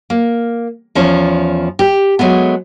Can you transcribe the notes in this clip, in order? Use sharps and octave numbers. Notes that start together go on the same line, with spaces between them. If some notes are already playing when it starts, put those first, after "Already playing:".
A#3
E2 F3 C#4
G4
F#3 G#3 A3 B3